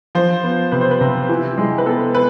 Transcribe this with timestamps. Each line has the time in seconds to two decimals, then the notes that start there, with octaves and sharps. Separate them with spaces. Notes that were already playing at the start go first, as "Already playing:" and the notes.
0.15 F3 C5
0.43 B3
0.72 C3 B4
0.81 C5
0.91 B4
1.01 C3
1.29 E3
1.58 G#3
1.78 B4
1.86 B3 A4
2.15 B4